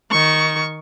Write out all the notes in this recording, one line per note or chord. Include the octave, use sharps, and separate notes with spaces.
D#3 C#6